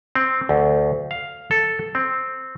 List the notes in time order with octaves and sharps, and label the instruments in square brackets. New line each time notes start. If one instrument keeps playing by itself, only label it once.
[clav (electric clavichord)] C4
D2
F5
A4
C4